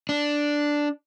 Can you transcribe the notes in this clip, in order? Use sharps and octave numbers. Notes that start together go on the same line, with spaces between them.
D4